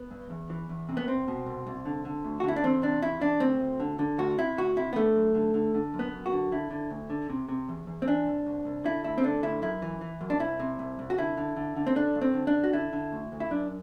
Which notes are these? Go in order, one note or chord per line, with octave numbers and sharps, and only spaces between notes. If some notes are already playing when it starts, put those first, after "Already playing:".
Already playing: B3
G2
E2
E3
E2
C3
B3
C2 C4
B2
C2
C2
D3
D3
D2
F#4
D3 E4
D4
E2 C4
C3 D4
E2 E4
E2 D4
D2 C4
D2
D3
D3
D2 F#4
C3 E4
D2 F#4
C3 E4
B3
D3 A3
F#2
D3
D3
D3
F#2
B3
F#2
F#4
D3
D3 E4
D3
D2
D3
C3
C3
E2
E2
C4
E3 D4
C2
C2
C2
D3 E4
D2 E4
C4
D3 D4
D2 E4
F#2 E4
E3
E3
F#2
D4
C2 E4
C3
C2
C2
F#4
D3 E4
D3
D3
D3
C4
D3 D4
G2
C4
D3
D4
D3
F#4
D3 E4
D3
D2
D2
E4
F#2 D4